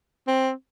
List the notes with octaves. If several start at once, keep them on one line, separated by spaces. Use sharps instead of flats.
C4